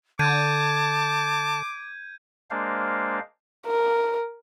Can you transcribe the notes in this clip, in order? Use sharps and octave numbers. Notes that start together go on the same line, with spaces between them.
D3 A5 D6 G6 G#6 D#7
G#3 A#3 D4 C5 F5
A#4